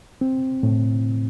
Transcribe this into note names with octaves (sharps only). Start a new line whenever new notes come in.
C4
A2